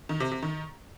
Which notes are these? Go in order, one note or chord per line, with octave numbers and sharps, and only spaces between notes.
D#3
C3
C3
D#3